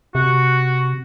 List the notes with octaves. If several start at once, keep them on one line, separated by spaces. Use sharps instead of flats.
C3 F#4